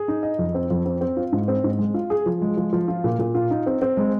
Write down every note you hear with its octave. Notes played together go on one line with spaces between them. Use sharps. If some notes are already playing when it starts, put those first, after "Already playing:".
Already playing: G#4
D#4
D#5
F2
C4
F2
C4
C4
F4
G#2
C4
G#2
G#3
F4
G#4
F3
G#3
F3
F3
F4
A#2
A#2
F4
D#4
C4
C4
G#3